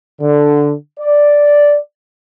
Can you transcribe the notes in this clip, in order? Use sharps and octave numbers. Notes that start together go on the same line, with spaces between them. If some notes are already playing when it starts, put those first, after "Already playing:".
D3
D5